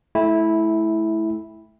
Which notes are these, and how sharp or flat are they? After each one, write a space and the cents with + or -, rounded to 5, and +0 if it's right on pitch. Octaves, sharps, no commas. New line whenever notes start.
A3 -25 E4 -10 G5 +30